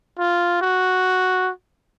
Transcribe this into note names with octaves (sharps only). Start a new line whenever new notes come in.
F4
F#4